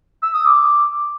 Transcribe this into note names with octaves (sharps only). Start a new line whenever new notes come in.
E6
D#6
D6